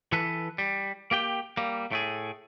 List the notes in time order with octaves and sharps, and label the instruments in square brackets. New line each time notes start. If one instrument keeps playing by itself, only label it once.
[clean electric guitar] E3 A4 B4
G3
A#3 G4 G5
G3 A#3
A2 A3 G#4